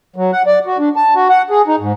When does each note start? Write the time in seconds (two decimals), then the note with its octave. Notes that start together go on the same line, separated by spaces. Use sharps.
0.16 F#3
0.32 F#5
0.47 D5
0.66 F#4
0.79 D4
0.96 A5
1.15 F#4
1.29 F#5
1.50 G#4
1.67 D#4
1.80 G#2